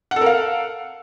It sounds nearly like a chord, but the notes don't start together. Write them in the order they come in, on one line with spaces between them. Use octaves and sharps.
F#5 A4 A#4 F5